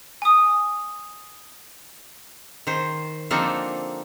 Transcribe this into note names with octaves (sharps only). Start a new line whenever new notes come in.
G#5 D#6
D#3 C5
D3 F3 A#3 C4 D#4 A4